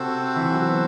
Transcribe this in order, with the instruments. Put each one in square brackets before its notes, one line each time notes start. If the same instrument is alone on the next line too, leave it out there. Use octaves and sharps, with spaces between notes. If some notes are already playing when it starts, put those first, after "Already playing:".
Already playing: [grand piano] C3 [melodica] C4 F#4 A4 C5
[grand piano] E3
F#3
B3